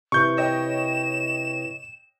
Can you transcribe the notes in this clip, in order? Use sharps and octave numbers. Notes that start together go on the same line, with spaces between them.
C3 E4 B4 C#6 G6
C#5 D#5 G5 E7